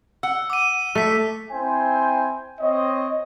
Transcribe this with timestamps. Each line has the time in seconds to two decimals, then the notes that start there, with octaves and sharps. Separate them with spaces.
0.23 F#5 E6
0.50 D6 D#7
0.95 A3 E6 B6
1.51 C4 E4 C5 G5 G#5
2.60 C4 C#5 D#5